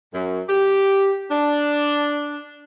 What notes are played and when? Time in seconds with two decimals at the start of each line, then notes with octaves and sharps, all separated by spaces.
0.13 F#2
0.49 G4
1.31 D4